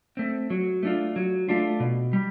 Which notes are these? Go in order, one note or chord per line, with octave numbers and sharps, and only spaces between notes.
A3 C4
F#3
A3 D4 F4
F#3
A3 D4 F4
B2
G3